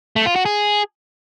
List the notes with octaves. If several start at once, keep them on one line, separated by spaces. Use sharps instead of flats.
A3
F4
F#4
G#4